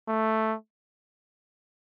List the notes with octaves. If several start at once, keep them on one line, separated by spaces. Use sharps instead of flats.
A3